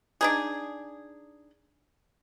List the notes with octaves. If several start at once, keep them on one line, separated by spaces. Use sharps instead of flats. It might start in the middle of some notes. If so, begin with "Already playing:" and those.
D4 D#4 G#4